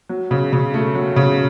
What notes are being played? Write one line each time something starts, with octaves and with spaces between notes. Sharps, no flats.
F#3
C#3
C#3
A3
F#3
C#3